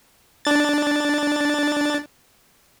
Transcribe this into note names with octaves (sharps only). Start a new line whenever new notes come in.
D4 A6